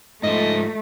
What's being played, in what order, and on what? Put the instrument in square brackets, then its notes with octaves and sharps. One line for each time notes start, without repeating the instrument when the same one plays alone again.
[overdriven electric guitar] G#2 F3 [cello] A3 [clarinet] D#5